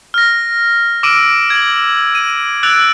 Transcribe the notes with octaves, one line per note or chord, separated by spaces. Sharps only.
F6 A#6
D6 E6 F6 D7 D#7
G#6 F#7
D#7
E6 F#6 A6 D7 F7